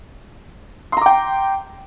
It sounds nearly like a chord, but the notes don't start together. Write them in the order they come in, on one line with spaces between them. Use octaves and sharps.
C6 A#5 D6 G5